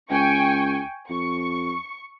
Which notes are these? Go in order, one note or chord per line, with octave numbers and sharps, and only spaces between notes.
C#2 G5 G#5 C#6
F2 C#6